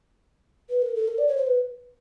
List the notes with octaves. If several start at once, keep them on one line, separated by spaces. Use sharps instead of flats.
B4
A#4
A4
A#4
D5
C#5
C5
B4